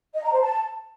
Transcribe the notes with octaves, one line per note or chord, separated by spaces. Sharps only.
D#5
A#5
C5
A5